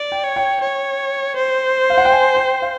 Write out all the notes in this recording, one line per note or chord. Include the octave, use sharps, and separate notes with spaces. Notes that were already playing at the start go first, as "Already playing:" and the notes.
Already playing: D5
G5
C#5
G5
C#5
C5
F5
F#5
G5
G#5
G5
F5